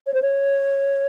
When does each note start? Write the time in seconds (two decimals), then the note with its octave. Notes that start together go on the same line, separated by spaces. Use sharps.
0.07 C#5
0.14 C5
0.22 C#5